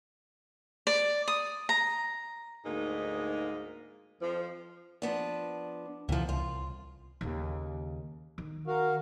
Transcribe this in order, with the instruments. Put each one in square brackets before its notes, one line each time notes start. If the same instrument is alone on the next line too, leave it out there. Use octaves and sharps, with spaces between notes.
[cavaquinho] D5
D#6
A#5
[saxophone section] D2 G#2 G#3 A#3 D#4
F2 F3
[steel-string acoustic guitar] F3 B3 D4
[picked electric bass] C#2 E3 [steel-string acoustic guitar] B2 F3
[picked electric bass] C2 [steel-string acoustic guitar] F4
[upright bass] D#2 C#3
D#3
[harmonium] F#4 A#4 F5